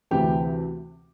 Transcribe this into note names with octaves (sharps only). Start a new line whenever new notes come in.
D2 C3 E3 G4